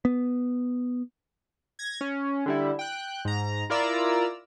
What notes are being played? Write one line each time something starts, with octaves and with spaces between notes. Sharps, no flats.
B3
G#6 A#6
C#4
D3 G3 E4
G5 F#6
G#2 A#5
E4 F4 A#4 D5 A#5 E6